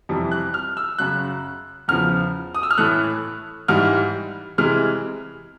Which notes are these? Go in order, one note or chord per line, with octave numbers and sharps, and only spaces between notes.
F2 C3 E3 G3
F#6
F6
E6
F#2 C#3 F#3 F#6
E2 C#3 F3 F6
D#6
E6
F6
A2 E3 A3 F#6
G#2 E3 G3 F6
C3 E3 G#3 F6